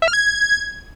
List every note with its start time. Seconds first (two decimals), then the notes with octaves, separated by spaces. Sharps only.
0.02 E5
0.08 F6
0.13 G#6